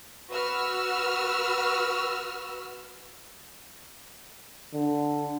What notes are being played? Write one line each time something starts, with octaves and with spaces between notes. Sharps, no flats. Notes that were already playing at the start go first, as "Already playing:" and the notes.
F#4 B4 E6 F6
D3